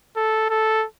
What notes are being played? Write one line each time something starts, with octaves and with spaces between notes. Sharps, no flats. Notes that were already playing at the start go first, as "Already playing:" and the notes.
A4
A4